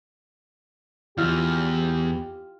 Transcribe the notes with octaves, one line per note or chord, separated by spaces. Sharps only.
E2 F4 G4 F5 E6